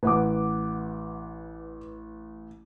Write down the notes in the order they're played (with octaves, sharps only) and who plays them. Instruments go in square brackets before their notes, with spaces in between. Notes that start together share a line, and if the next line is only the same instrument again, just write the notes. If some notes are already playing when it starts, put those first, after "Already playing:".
[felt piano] A1 [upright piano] B4 F#5 D6